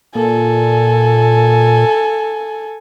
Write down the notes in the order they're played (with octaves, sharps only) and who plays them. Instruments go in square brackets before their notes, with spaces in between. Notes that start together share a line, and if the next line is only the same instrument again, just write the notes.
[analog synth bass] A#2 [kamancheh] A4 G#5